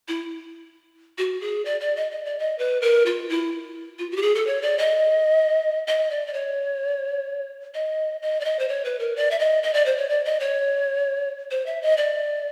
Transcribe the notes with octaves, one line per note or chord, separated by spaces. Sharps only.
E4
F#4
G#4
D5
D5
D#5
D#5
D5
D#5
B4
A#4
F4
E4
F4
F#4
G4
G#4
A4
C#5
D5
D#5
D#5
D5
D5
C#5
D#5
D#5
D5
D#5
C5
C#5
B4
A#4
D5
E5
D#5
D#5
D5
C5
C#5
D5
D#5
C#5
C5
E5
D#5
D5